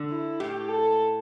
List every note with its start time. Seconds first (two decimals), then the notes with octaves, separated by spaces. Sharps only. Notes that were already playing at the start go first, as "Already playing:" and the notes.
Already playing: D3
0.11 E4
0.40 A2 G4
0.69 A4